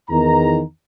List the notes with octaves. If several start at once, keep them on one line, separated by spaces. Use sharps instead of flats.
E2 D#3 A#5